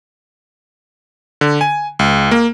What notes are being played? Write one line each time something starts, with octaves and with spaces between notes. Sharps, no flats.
D3
G#5
C#2
A#3